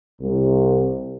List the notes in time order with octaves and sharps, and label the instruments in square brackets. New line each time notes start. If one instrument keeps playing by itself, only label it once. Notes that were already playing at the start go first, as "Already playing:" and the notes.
[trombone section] C2